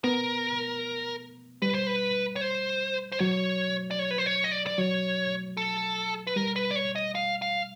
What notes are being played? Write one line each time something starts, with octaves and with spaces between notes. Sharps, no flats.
B3 A#4
G3 B4
C5
B4
C#5
C5
C5
F#3 C#5
D5
C#5
B4
C5
C#5
D#5
D5
D5
F#3 C#5
A4
B4
G3 A#4
B4
D5
C#5
D#5
F5
F5